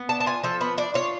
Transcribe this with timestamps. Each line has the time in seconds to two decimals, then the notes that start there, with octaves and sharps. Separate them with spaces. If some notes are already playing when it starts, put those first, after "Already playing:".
Already playing: B3
0.09 D4 A5
0.20 A5
0.26 F4 G#5
0.43 F3 A4
0.60 B3 B4
0.78 D4 D5
0.94 F4 C#5